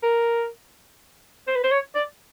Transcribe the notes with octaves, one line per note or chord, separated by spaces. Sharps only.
A#4
C5
B4
C5
C#5
D5